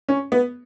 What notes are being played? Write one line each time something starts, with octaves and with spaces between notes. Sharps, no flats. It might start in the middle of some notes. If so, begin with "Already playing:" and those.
C#4
B3